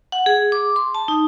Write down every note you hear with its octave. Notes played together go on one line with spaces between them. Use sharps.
F#5
G#4
D6
C6
A5
D#4